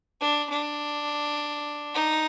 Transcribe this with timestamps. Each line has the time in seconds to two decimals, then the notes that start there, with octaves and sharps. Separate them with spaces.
0.21 D4
0.50 D4
1.94 D#4